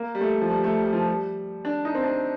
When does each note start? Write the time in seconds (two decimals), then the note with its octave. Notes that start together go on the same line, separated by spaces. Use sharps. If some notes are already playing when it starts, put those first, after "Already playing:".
Already playing: A#3
0.15 G3
0.21 A3
0.41 F3
0.50 G3
0.64 A3
0.78 G3
0.93 F3
1.07 G3
1.65 D4
1.85 D#4
1.95 C4
2.04 D4